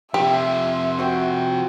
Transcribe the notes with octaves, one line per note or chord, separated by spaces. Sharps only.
C3 F3 G4 E5 C6
F#4 C5 G5